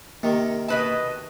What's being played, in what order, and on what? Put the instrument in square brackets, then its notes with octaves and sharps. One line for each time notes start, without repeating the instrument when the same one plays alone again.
[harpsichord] C3 D#3 [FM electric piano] A#3 [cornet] A#4
[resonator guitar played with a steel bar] B2 B4 A5 [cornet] D#5